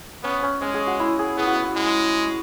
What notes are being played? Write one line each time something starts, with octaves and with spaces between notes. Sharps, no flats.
B3 C#4
C#4
G#3 C#4
G#4
F#4
E4
G#4
B3 G#4
F#4
E4
F#4
G#3